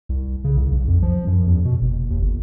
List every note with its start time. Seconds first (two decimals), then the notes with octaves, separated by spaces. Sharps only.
0.09 C2
0.44 C#3
0.57 C2
0.72 B1
0.88 F2
1.02 F3
1.27 F#2
1.46 E2
1.65 B2
1.82 F#1
2.10 D#2
2.22 G1